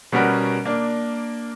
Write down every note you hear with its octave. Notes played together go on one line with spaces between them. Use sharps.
B2 G3 C#4 F#4 A#4 B4
A#3 D4